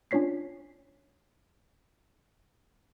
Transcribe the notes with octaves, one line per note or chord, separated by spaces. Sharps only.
C#4 D4 F4 C#5 B6 C7